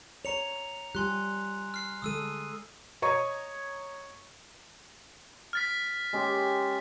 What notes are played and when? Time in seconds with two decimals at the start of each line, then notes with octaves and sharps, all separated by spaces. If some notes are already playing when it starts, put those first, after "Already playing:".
0.25 C#5 A#5 C#7 F7
0.95 G3 F4 G4 G#5 C6 F#6
1.74 F6 C7
2.02 D3 G#3 A4 D#6 E6 D#7
3.02 C#5 D#5 A#5 C#6
5.53 F6 A6 B6
6.13 G#3 C#4 G4